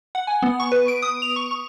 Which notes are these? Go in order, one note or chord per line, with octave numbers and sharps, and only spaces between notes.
F#5
G#5
B3
C#6
B4
D7
D#6
F7
C#6
C#6